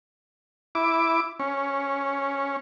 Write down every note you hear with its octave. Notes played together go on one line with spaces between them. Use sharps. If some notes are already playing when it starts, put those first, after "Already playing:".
E4 D6
C#4